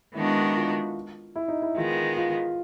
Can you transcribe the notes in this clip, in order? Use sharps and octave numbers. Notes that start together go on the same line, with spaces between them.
D#3 G#3 B3 D4 E4 F#4
F4
E4
D#4
E4
D#3 G#3 B3 F4
F4